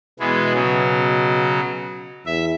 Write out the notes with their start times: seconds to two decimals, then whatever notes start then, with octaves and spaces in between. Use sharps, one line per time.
0.20 B2 E3 G#3 B3
0.54 C#3 F#3
2.26 E2 E5